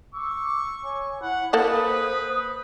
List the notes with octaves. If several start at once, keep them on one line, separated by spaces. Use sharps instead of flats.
C#6 D6 E6
C#5 G#5
E4 F#5 B5
A#3 A4 B4 C5 F#5 D#6